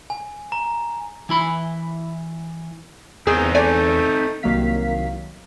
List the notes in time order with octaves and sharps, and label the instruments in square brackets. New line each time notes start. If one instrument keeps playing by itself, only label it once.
[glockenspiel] G#5
A#5
[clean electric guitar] E3 E4 B5
[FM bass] E2 [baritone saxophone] D#3 [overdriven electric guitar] C4 D#4 [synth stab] G#4
[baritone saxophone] A3 [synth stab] D5 G#5
[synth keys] C2 D#3 F#3 A#3 F5 B6